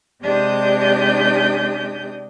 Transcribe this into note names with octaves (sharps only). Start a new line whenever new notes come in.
C3 G#3 D4 G4 D#6 G6